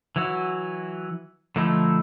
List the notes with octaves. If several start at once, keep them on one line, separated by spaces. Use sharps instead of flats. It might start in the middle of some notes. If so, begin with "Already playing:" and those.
E3 F#3 E4 F#4
D3 F3 A3 D#4 E4